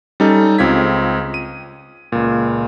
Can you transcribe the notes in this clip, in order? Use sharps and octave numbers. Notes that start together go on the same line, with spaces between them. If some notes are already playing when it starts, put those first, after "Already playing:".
G3 C#4 D#4 A4
C#2 C4 F4 G#6 B6
D#7
C#2 A#2